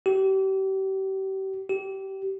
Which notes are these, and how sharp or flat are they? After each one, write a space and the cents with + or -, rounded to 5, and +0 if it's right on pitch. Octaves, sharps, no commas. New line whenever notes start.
G4 -35
G4 -25